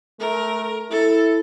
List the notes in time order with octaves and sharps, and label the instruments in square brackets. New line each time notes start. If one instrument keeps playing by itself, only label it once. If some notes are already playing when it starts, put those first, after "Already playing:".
[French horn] A3 [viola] A#4
[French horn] E4 [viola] A4